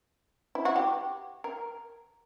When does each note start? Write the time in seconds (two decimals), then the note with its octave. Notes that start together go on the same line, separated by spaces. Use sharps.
0.55 E4
0.65 F#4
0.76 G4
1.44 A#4